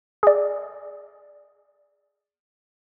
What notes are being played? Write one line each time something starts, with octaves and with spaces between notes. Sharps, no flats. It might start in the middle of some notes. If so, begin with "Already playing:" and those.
G#4 D5